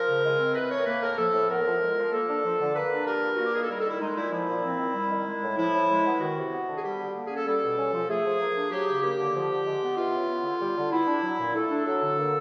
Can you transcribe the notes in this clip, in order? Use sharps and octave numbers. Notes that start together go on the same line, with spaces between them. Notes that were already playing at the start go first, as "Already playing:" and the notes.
Already playing: F3 A#4
C#3
G#3
C4
E3 B4
A2 C#5
A#4
A#3 B4
A2 A#4
F3 A4
A2
B3 A#4
F3
G#3
F3
A#3 A4
D4
F3
D3
A#3 B4
D4
G3 A#4
A#2
A#3 F#4
G4
D#3 G#4
A4
G3 A#4
A4
D#3
E4
G#3 D#4
A#2 E4
F3 E4
A#2
C4
D#3
G3
D#3
G#3
A2
F3 E4
A2
G#3
B3
D#3 F#4
C3
B3
D3
G#4
G3 G4
D3
A#3
C#4 G#4
A4
G3 A4
B2
C#4
F3
A3 G#4
F3
A#3
D4
F#3 G4
C#3
A#3 G4
D3
F3
D3
G#3
B3
E3 F4
C#3
B3
D3
G3
D3
B3 E4
D4
F#3
A#2
A3 A4
D4
F#3 A4
D3
A#3